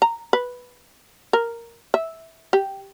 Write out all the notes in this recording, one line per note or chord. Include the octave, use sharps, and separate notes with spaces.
A#5
B4
A#4
E5
G4